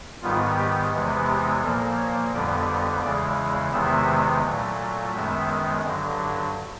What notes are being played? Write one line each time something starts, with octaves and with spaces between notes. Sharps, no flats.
G#2 D#3 G3 B3 F4
G4
E2 C3 E3 G#3 B3
G4
A#2 F3 A#3 A4
C#5
F2 D3 G3 B3 D5
D5
E2 C#3 E3 G#3 D5
E2 C3 D#3 G#3 B3 E5
A#2 F#3 A3
F#2 D#3 G#3 B3 E5
G2 D3 F#3